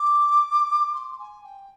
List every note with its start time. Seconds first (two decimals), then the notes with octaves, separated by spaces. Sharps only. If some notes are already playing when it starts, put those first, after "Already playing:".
Already playing: D6
0.94 C6
1.19 G#5
1.44 G5